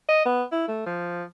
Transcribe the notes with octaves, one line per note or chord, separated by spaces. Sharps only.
D#5
B3
E4
A3
F3